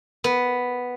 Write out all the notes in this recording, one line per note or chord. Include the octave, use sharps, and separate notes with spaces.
B3